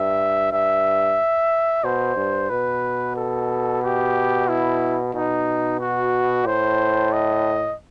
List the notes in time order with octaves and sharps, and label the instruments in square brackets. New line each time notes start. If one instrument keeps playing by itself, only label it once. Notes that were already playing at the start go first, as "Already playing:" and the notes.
Already playing: [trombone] G2 [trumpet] E5
[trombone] G2 [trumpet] E5
[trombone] B2 [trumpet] C5
[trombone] G2
[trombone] B2 [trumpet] B4
[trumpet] A4
G4
E4
[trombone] B2 [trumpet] D#4
[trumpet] F#4
[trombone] A2 [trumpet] C5
[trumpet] D#5